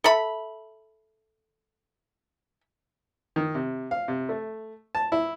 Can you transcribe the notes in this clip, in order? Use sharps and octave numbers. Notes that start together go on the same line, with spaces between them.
A4 E5 B5
D#3
C3
F5
C3
A3
A5
E4